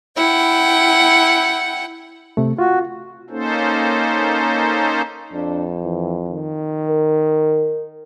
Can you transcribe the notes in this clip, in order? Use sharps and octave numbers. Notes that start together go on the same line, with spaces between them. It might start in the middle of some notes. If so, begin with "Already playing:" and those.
E4 F#5 G5
C3 A3
F4 F#4
A#3 C#4 D#4 A4 C5
F2 D4
E3
D#3
A#4